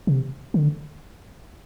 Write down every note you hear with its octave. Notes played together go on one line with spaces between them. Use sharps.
C3
D3